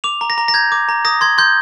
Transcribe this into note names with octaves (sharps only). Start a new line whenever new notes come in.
D6 F7
A#5
A#6
A#5
A#6
G6 G#6
D6
A#5
D#6 A#6
C6 G#6
C6 G6